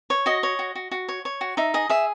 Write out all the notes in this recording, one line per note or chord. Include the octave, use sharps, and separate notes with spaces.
C#5
F#4 D#5
C#5
F#4
F#4
F#4
C#5
C#5
F#4
D#4 E5
G#4 D#5
G#4 E5